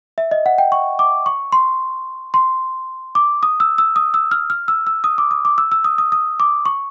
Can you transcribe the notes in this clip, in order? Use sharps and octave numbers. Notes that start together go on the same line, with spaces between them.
E5
D#5
F#5
G5
C#6
D6
C#6
C6
C6
D6
D#6
E6
E6
D#6
E6
F6
F6
E6
E6
D#6
D6
D#6
D6
E6
E6
D#6
D#6
D#6
D6
C#6